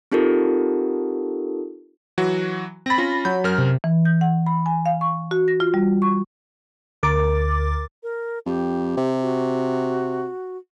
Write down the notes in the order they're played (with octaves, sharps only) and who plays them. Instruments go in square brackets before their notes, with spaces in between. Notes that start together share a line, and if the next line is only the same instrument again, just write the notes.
[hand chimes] C4 D#4 F4 G4 A4 A#4
[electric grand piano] E3 F#3 F#4
[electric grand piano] C4 A6 [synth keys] B5 A#6
[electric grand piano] C#4 F4
[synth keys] F#3 [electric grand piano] B5 G6
[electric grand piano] F#2 A#4 F6
[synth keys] C3
[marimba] E3
G6
F#5
B5
G#5
F5
C#6
F#4
A#6
F4
G3
C#6
[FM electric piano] D2 A#4 D6 A6
[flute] A#4
[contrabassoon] F2 [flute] G4
[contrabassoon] C3
[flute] F#4